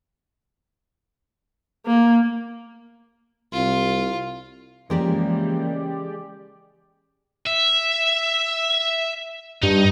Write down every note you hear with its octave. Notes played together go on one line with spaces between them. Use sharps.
A#3
C2 F4
C#3 E3 F3 G#3 A#3 G4 A#4 D5
E5
G2 D#4